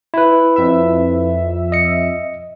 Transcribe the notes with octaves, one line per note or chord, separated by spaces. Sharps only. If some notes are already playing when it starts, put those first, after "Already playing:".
E4 B4
F2 E5
D#5 C#7